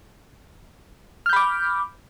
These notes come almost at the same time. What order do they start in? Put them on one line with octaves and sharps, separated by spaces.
F6 G6 B5 D6